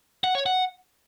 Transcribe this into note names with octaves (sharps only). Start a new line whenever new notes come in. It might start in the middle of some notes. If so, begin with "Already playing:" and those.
F#5
C#5
F#5